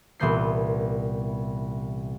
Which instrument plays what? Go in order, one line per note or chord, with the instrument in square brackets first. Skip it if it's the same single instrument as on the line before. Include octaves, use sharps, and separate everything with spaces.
[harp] C2 A#2 E3 B3 G6 C7